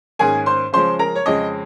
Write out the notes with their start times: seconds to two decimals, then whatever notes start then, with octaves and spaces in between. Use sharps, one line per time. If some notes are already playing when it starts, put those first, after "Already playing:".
0.19 G#2 D#3 A#3 C#4 G#4 G#5
0.46 C5 C6
0.73 C#3 F3 G#3 C#4 C5 C6
0.99 A#4 A#5
1.15 C#5
1.26 F2 C#3 G#3 C#4 D#5